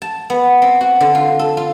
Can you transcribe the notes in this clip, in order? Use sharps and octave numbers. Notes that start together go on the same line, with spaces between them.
A5
B3
C4
F#4
D3
F4
A4
F4